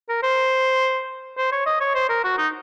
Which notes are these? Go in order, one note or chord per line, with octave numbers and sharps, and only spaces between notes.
A#4
C5
C5
C#5
D#5
C#5
C5
A#4
F#4
D#4